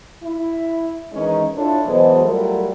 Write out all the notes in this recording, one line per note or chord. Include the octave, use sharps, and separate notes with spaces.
E4
D#3 E3 G#3 C#4 D#4
D4 E4 F4 A4 C#5
B2 E3 F#3 G#3 A4 C5
F#3 G3 A3 F4 G4 A#4